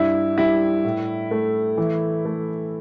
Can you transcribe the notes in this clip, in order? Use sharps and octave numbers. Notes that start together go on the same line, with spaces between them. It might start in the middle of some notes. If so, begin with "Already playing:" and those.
Already playing: G2 E4
G3 E4
A2
A3
E3
A3